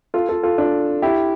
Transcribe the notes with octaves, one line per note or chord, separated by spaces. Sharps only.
F4 A4
F4 A4
F4 A4
D4 F4
E4 G4